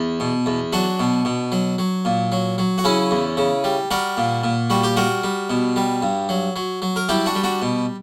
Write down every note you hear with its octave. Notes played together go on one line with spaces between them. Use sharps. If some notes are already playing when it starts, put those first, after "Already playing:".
Already playing: E2
B2
E2
F#3 D4 F#4
B2
B2
F#3
F#3
A#2
F#3
F#3
F#4
C#3 C#4 E4
E2
C#3
G3
G3 F#4 A#4
A#2
A#2
G3 F#4
G4
G3 F#4 A#4
G3
B2
G3
G2
F#3
F#3
F#3
A#4
G3 E4 G4
D4 F#4
G3
D4 F#4
B2